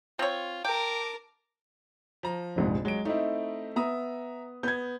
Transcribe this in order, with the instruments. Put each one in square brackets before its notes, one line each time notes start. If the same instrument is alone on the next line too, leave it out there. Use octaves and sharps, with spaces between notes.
[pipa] C4 C#5 [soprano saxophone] F4
[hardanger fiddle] A#4 A5 [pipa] G5 [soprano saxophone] D6
[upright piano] F3 A#5
[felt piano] F1 A#1 G#2
[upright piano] F#3 D7 [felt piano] G#3
[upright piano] A3 C4 E4 [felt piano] D#4
[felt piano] B3 [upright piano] E5 A#5 D#6
[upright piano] B3 [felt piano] G6 G#6